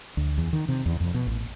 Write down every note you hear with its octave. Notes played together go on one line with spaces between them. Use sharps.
D2
E2
D#3
C3
E2
F2
B2
A1